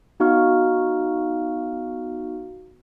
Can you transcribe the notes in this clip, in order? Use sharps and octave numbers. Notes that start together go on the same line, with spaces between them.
B3 D#4 F#4 F5 C#6 F6